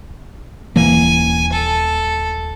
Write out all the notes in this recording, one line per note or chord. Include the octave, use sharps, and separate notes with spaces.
D#1 E3 A#3 G#5
A4